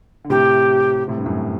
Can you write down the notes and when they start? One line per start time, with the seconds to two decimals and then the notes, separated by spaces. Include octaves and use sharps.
0.24 D3
0.30 A2 C3 G4
1.08 A2 C3
1.18 G2
1.26 F#2 A2